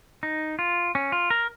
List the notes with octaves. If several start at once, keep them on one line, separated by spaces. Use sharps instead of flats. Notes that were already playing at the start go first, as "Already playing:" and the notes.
D#4
F4
C#4
F4
A#4